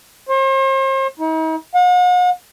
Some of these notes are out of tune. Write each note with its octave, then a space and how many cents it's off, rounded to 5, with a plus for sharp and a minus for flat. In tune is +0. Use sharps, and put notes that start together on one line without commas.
C5 +40
D#4 +45
F#5 -45